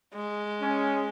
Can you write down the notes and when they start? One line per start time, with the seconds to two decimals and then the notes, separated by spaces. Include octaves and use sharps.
0.15 G#3
0.61 C#4